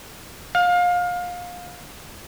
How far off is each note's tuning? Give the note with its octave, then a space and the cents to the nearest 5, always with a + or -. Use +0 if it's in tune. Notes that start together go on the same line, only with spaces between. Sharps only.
F5 +25